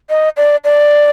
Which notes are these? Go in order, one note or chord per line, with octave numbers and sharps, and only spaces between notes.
D#5
D5
D5